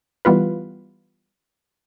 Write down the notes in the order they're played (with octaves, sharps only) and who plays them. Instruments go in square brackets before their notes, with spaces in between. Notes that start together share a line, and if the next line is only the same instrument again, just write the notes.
[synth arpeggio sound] E3 G3 B3 F4 B4